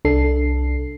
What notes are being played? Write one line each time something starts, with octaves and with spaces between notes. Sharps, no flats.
C2 D4 A4 C7